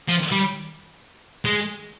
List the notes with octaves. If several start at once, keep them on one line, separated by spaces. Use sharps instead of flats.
F3
G3
G#3